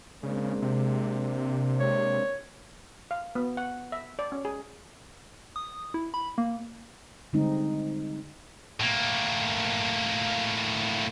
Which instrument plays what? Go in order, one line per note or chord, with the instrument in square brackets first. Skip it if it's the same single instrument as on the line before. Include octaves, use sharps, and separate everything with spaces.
[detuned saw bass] C#3 [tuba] G#3 [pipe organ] A#3 C4 D4
[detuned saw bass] C3
[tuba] G#3 [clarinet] C#5
[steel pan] F5
B3
F#5
E5
D5
C#4
G#4
[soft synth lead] D#6
E4
B5
A#3
[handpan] D3 G3 G#3 C4 D#4
[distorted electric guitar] A2 A#3